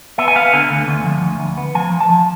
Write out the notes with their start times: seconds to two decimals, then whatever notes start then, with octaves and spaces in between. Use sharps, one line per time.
0.18 B3 E5
0.28 G#5
0.36 B3 F5
0.53 D3 G#5
0.71 D2
0.88 D2
1.05 F3
1.23 D2
1.40 D2
1.57 B3
1.75 F3 G#5
1.92 F3
2.00 A5
2.10 F3